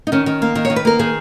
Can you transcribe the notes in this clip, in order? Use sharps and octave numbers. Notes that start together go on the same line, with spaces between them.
D#4
D#3 C#4
D#3
A#3
D#3
C#5
D#3
B4
A#3 A#4
D#3 G#4